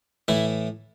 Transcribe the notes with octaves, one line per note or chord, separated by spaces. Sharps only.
A2 E3 E4